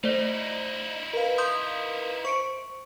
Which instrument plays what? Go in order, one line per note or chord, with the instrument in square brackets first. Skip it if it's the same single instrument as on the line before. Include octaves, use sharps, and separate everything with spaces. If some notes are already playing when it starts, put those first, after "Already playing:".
[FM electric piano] A3 [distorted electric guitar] D#4 E4 [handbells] C5 D5
[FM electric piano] A#4 B4 F5
[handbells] C6 D#6 G6
[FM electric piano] C5 [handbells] C#6 C#7 D7